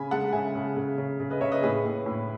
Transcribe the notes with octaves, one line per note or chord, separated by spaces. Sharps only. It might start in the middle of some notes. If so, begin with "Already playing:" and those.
Already playing: C#3 G#5 B5
G#3 F#5 A5
C#3 E5 G#5
C#3
C#3
C#3
C#3
B4 D#5
C#3 C#5 E5
B4 D#5
A2 G#4 B4
A2
A2